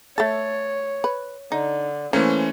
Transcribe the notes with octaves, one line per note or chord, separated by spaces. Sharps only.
A3 A4 C#5 A6
B4
D3 D#4
E3 A3 A#3 C#4 C5